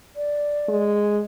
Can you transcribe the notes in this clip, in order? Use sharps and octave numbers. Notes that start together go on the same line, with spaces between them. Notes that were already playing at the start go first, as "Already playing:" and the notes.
D5
G#3